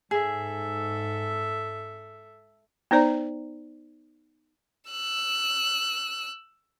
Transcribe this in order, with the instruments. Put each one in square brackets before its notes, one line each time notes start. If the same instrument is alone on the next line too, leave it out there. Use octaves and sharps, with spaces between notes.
[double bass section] G#2 [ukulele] G#4 [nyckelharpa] A4 E5
[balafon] B3 D#4 C5 D5 A#5
[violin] E6 F#6